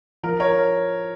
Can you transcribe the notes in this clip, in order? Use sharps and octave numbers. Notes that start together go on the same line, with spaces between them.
F3 A#4
A#4 C#5